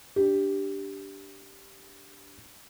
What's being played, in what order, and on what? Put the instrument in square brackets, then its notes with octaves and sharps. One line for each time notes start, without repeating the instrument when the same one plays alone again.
[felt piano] D4 G4